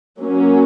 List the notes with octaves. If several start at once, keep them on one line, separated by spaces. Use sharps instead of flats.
F#3 A#3 C#4